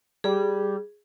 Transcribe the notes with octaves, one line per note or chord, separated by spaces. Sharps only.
G3 G#4